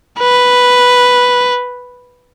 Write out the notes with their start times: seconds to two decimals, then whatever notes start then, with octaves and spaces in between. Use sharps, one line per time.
0.19 B4